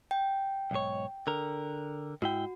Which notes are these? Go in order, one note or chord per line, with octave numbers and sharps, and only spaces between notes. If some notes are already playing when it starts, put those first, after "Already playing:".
G5
B1 G#2 C#5
D3 A#4
G#2 E4 F#4 G5